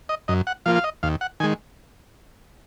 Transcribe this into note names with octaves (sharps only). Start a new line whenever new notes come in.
D#5
F#2 D#5
F#5
F3 A#3 F4 F5
F5
D#5
D#2 F5
F#5
D#3 G#3 G#5